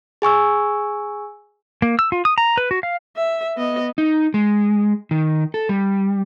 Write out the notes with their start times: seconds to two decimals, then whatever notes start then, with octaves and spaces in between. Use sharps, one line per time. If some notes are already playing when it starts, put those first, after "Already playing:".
0.22 G#4 G#5 C#6 E6
1.82 A#3
1.99 E6
2.12 F4
2.25 D#6
2.38 A#5
2.57 B4
2.71 F#4
2.83 F5
3.17 E5
3.57 B3 D#5
3.98 D#4
4.34 G#3
5.11 D#3
5.54 A4
5.69 G3